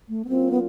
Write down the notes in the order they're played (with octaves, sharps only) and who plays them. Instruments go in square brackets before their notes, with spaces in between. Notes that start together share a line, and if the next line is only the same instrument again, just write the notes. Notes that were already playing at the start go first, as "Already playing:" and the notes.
[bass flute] A3
B3
[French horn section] F#3 A#3 C#4 F4 [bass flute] C4
[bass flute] B3